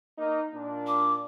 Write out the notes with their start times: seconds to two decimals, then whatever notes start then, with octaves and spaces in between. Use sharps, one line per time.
0.18 A#3 D#4
0.54 A#2 D4
0.87 D6